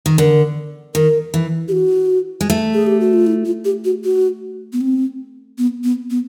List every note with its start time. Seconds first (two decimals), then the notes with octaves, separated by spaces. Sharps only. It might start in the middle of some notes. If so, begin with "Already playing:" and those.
0.06 D#3
0.18 D3 A#4
0.95 D#3 A#4
1.34 E3
1.68 G4
1.72 F#4
2.41 G#3
2.50 A3
2.74 G#4
2.87 G4
3.00 F#4
3.13 F4
3.27 E4
3.45 F4
3.65 G4
3.85 F#4
4.04 F#4
4.73 B3
4.81 C4
5.58 B3
5.84 B3
6.10 B3